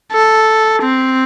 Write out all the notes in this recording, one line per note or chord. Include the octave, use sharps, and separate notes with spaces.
A4
C4